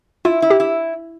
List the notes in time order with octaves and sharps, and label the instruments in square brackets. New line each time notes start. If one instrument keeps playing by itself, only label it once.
[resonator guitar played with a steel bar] E4 [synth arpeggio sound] F4
[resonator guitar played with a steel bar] E4
[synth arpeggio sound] G4
[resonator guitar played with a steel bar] E4